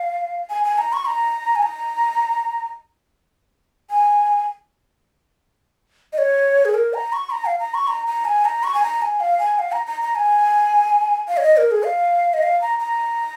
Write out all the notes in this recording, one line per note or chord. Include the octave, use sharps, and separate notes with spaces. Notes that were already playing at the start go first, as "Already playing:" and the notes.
Already playing: F5
G#5
G#5
A#5
C#6
A#5
G#5
A#5
G#5
D#5
C#5
G#4
A#4
A#5
C#6
A#5
F5
A#5
C#6
A#5
A#5
G#5
A#5
C#6
G#5
A#5
G#5
F5
G#5
F5
A#5
A#5
A#5
G#5
F5
C#5
D#5
A#4
G#4
F5
D#5
F5
A#5
A#5